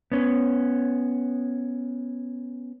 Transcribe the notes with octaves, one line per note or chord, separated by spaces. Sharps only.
B3 C#4